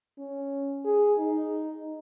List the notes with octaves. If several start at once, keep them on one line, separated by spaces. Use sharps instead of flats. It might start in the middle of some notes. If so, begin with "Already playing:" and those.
C#4
G#4
D#4